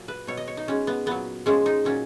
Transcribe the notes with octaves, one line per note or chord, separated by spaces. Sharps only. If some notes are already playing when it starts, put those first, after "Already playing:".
Already playing: A#2 F#3
B4
B2 F#3 C#5
D#5
C#5
D#4
B2 G#3 C#4
B3
A#2 F#3 B3
A#2 F3 G#3 C#4
D#4
A#2 F#3 C#4